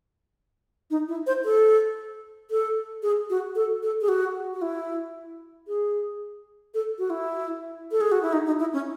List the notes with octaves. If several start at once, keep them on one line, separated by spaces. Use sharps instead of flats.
D#4
E4
C5
A4
A4
G#4
F#4
A4
A4
G#4
F#4
F#4
E4
G#4
A4
F#4
E4
A4
G#4
F#4
E4
D#4
D#4
E4
C#4